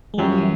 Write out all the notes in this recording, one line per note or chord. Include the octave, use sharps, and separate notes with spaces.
G#3
F#2 F3 G3
E3